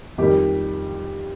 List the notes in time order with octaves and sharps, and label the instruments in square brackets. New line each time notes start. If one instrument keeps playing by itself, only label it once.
[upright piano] F2 D#3 G3 G4